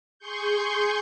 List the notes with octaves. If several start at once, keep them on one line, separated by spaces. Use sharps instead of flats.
G#4 C6 C#6 G6